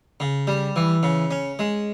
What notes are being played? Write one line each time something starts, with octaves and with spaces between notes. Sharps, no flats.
C#3
G3
E3
C#3
C#4
G#3